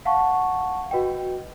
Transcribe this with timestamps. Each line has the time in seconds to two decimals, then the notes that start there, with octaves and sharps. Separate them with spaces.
0.05 F5 F#5 A5 C#6
0.91 F#4 B4 D#5 G5